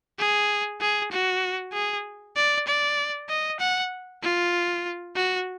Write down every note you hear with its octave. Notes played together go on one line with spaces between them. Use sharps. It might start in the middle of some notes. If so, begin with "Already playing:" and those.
G#4
G#4
F#4
G#4
D5
D5
D#5
F#5
F4
F#4